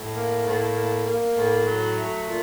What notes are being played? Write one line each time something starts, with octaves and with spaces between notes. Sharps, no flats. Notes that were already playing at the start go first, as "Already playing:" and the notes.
Already playing: A2
A#3
A2
A#3
A#3
A2
F#3
A3
A#2